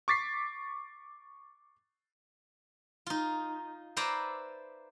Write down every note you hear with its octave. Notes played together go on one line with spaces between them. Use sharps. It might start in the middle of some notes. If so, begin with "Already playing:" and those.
C#6 D6 A6 B6 C7
D#4 F4
B4 C5 D5 E5 A#5